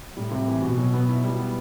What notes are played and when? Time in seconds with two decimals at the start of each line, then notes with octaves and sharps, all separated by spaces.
0.16 A2 G3
0.31 C3
0.48 E3
0.62 B2 F#4
0.78 F#3
0.93 B3
1.09 E4
1.24 G3
1.39 B3